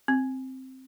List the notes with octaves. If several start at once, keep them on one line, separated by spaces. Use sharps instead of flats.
C4